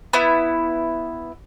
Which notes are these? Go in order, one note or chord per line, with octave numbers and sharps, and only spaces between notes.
B3 E4